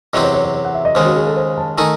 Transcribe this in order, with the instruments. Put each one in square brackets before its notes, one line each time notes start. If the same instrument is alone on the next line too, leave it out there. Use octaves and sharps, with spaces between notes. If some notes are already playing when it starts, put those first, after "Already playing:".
[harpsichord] E2 C3 F#3 C4 [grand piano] D#5
[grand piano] C#5
C#5
C#5
C#5
F#5
E5
D#5
[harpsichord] D#2 C#3 G#3 [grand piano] C5
[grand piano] F#4
G#4
A4
C5
A5
[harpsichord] D#3 A3 D#4 [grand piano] G#5